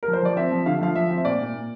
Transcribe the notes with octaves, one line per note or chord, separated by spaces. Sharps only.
A#4
F3
C5
F3 D5
C4 E5
F3
D3 F5
E5
F3 F5
F3 E5
C4
E5
A#2 D5
A#2
A#2